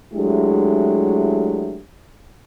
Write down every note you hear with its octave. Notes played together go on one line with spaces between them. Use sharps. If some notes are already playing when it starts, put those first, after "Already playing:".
F#3 G#3 A3 D4 E4 G4